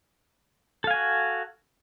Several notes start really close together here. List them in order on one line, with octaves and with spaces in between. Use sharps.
A4 F5 G#5 F#4